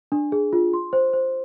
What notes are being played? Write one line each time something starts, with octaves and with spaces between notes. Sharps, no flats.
D4
G#4
F4
C6
C5
C5